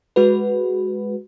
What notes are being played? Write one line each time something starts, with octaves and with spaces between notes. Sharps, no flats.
G#3 F#4 B4